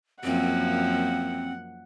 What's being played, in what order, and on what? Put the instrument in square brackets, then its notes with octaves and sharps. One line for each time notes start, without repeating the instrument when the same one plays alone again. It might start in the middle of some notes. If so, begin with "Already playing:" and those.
[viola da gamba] F#2 F3 A#3 [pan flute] C4 [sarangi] F#5